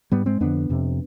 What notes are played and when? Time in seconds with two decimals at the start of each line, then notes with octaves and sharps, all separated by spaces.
0.12 G#2 G3 B3
0.26 G#3 C4
0.40 F2 D3 B3 D4
0.69 F2 C3